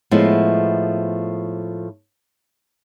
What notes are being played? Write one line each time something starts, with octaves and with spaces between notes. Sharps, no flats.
A2 F3 G#3 B3 E4